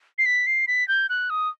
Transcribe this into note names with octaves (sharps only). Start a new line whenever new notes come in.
C7
B6
C7
B6
G6
F#6
D#6